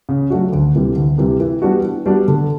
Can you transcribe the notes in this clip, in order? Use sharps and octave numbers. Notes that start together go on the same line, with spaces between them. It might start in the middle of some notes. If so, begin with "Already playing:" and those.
C#3
F#3 A3 D4 F#4
D2
C3 E3 G3
D2
C3 E3 G3
E3
G3 B3 D4 F#4
E3
G3 B3 D4 F#4
D3